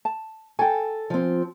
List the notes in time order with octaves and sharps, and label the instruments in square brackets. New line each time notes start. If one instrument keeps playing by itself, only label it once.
[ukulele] A5
[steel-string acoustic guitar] A4 [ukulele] G5 G#5
[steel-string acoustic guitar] F3 C4